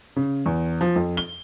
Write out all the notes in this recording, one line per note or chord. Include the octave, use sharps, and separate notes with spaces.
C#3
E2
F3
F2
G7